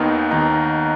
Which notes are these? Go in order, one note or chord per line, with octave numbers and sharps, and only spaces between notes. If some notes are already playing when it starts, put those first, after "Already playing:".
Already playing: D#2 D#3 B3 D#4
D#2 D#3 B3 D#4